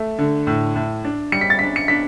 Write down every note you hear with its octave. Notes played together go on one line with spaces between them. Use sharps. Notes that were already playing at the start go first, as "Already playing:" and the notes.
Already playing: A3
D3
A2
A2
D4
G3 C#7
B6
A6
D4 B6
C#7
D4 B6